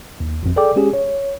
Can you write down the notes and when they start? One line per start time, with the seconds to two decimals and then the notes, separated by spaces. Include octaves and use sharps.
0.20 D#2
0.43 G#1 F2
0.56 G#4 A4 D5 G5 D6
0.76 G#3 C#4 G4 G#4
0.93 C#5